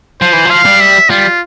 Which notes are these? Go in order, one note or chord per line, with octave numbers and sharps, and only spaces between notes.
F3 C5
E3
F3
F5
G3
E5
G3 F4